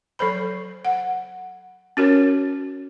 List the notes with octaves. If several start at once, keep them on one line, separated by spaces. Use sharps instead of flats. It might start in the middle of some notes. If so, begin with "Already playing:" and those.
F#3 A4 C5 B5
F#5
C#4 F#4 A#4 C#5